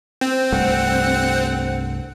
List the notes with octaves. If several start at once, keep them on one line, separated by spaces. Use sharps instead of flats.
C4
C2 G2 A3 F#5